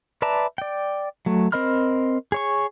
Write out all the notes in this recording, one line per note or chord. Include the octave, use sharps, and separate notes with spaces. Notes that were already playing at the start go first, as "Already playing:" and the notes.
B4 D5 E5 A5 A#5
D5 G5
F#3 A3
C4 A#4 D#5 B5 F6
G#4 C#5 C#6